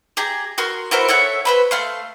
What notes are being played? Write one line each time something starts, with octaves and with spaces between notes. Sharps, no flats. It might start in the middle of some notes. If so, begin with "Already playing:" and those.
G4 G#4 A#5
F#4 A#4 C6
E4 F#4 A#4 C5
A4 C#5 E5 F#5
B4 C5 B5
A3 F5 C6